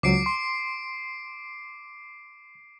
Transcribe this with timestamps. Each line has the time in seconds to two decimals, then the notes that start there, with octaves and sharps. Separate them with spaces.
0.03 C#2 F#3 D6 C7 D7
0.26 C6